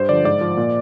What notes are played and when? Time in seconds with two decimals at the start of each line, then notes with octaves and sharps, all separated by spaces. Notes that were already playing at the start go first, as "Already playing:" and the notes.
Already playing: G2 C5
0.09 D3 F3 D5
0.25 G#2 D5
0.41 F3
0.57 A#2